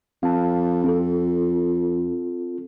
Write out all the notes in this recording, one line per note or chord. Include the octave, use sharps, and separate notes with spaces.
F2 F5 A5
C4 F4 A4